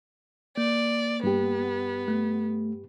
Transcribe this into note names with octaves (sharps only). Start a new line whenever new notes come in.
A#3 D5
G2 B3 G4
A3